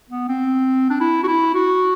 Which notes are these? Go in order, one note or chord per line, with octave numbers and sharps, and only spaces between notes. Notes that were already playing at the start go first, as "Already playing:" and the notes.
B3
C4
D4
E4
F#4
E4
F#4